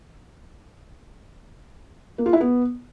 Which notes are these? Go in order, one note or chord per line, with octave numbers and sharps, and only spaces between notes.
A#3
F4
E4
B3